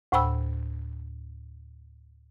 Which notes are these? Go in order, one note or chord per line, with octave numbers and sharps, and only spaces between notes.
D2 A2 C5 G5 B5 E6